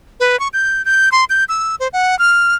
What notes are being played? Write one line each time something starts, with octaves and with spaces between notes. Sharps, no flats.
B4
C#6
G6
G6
C6
G6
E6
C5
F#5
F6